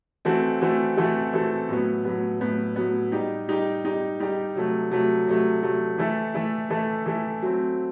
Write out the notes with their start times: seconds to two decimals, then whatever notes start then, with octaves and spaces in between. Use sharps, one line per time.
0.25 E3 A3 C4 F#4 A4
0.61 E3 A3 C4 F#4 A4
0.97 E3 A3 C4 F#4 A4
1.33 E3 A3 C4 F#4 A4
1.68 A2 F#3 B3
2.05 A2 F#3 B3
2.40 A2 F#3 B3
2.76 A2 F#3 B3
3.12 G3 D#4 G4
3.48 G3 D#4 G4
3.84 G3 D#4 G4
4.20 G3 D#4 G4
4.56 C3 F#3 A3
4.91 C3 F#3 A3
5.27 C3 F#3 A3
5.63 C3 F#3 A3
5.98 E3 A3 E4 A4
6.34 E3 A3 E4 A4
6.70 E3 A3 E4 A4
7.06 E3 A3 E4 A4
7.42 F#3 A3 C4